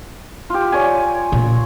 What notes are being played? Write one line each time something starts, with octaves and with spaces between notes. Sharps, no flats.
F4 G4
C#5 D5 G#5
A#2